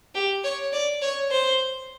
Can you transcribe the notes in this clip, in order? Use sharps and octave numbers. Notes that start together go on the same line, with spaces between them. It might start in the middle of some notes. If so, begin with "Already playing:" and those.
G4
C#5
D5
C#5
C5